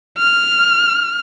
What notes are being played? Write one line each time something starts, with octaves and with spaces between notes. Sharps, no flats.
F6